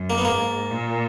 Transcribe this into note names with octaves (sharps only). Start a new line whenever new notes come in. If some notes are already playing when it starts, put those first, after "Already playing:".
Already playing: F#2
A#3
B3
G#2 A#3
A#2